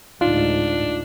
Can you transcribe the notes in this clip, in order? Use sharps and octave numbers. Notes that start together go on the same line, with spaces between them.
A1 D2 G#2 D4 D#4 F4